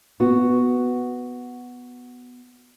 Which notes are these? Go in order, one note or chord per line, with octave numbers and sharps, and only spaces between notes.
B3 F#4